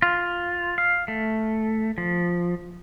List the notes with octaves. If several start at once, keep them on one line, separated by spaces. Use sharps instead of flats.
F4
F5
A3
F3